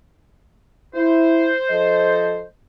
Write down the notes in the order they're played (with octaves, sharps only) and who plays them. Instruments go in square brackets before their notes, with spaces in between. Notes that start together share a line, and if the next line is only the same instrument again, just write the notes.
[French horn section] E4 [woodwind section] C5
[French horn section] F3 A4 D#5